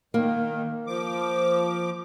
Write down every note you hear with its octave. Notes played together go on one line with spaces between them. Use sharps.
D#3 A#3
F3 D6